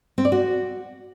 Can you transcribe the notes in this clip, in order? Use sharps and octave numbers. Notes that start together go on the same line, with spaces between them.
C4
D5
F#4